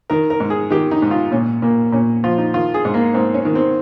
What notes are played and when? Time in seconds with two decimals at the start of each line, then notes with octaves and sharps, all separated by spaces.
0.10 D#3 A#4
0.30 A#4
0.40 G#2
0.50 G#4
0.70 D#3 G4
0.91 D#4
1.02 G#2
1.11 F4
1.32 A#2 C#4
1.62 A#2 A#3
1.92 A#2 C#4
2.24 F3 F4
2.38 D#4
2.54 D#3 F4
2.74 G#4
2.85 G#2
2.94 A#3
3.14 G#2 C4
3.34 C#4
3.45 D#3
3.55 C4